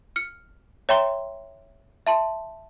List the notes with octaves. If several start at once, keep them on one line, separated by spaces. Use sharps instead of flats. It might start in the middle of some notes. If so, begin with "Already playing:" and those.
F6 C#7
C#5 E5 G5 A#5 C6 G7
E5 A5 C6